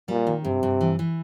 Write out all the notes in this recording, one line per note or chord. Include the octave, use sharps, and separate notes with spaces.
A#2 G3
D#3
G2 C3
G2
E3
E3